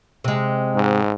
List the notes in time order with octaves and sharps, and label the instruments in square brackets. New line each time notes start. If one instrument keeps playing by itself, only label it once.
[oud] C3 G#3
[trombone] G#2